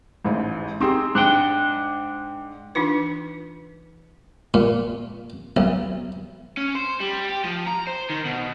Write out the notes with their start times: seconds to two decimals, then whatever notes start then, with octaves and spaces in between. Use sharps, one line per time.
0.24 A1 G#2
0.80 C4 D#4 G4 G#4
1.15 G#2 D4 G5
2.75 E3 D4 D#4 F4 B4
4.54 A#2
5.57 B1
6.58 C#4
6.75 C5
7.00 G3
7.29 G4
7.45 F3
7.67 A#5
7.87 C5
8.10 D#3
8.25 B2